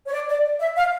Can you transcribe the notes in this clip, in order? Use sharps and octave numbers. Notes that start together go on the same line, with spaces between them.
C#5
D5
D5
E5
F5